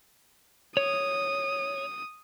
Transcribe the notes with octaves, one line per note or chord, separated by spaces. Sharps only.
C#5 D#6